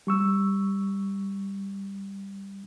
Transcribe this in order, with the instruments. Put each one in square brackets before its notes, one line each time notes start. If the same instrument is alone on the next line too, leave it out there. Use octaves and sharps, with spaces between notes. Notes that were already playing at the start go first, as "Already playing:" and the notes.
[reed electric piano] G3 C#6 E6